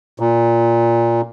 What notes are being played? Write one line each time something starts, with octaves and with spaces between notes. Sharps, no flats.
A#2